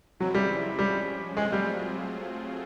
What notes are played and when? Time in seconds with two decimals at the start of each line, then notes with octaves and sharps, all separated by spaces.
0.20 C#3 E3 F#3 G#3 C4 E4
0.34 G3
0.79 F3 G3 G#3 C#4
1.37 F#3 G#3 A3 C4 F4 G#4
1.52 G3